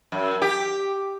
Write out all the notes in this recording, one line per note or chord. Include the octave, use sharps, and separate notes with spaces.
F#2
G4